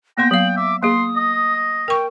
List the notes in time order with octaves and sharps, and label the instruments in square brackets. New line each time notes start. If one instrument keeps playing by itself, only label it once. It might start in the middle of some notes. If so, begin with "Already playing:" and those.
[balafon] A#3 B3 C6 [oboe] G5 [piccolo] A#6
[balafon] F#3 F5 [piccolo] F#7
[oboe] E5 [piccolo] D6
[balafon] A#3 G#4 [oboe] C6 [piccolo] D#6
[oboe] D#5
[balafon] A#4 C#6 [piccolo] G5